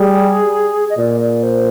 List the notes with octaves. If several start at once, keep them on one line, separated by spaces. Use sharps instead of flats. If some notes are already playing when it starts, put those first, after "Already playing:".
Already playing: G3 G#4
D#5
A#2 D5
D5
C5